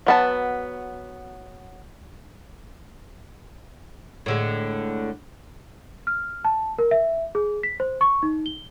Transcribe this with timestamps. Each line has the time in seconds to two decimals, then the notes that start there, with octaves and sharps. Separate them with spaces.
0.06 F#3 B3 A5
4.26 A2 D3 G#3
6.07 F6
6.45 A5
6.79 A#4
6.91 E5
7.35 G#4
7.63 B6
7.80 C5
8.01 C#6
8.23 D#4
8.46 G7